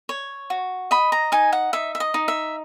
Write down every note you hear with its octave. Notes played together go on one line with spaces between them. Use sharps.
C#5
F#4
D#5 B5
A#5
D#4 G#5
F#5
D#4 E5
E5
D#5
D#4
E5